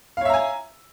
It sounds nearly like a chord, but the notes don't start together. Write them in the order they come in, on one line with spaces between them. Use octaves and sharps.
F5 C#5 E5 A#5 G#5